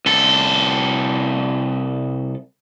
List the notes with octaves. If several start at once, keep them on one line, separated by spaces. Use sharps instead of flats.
C2 A4